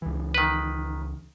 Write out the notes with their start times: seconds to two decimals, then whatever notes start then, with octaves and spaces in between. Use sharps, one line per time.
0.02 C#2 E3
0.34 D#3 B4